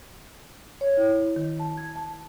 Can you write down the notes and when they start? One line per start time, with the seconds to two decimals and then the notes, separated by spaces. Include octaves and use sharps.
0.81 C#5
0.97 E4
1.36 D#3
1.60 A5
1.77 G#6
1.96 A5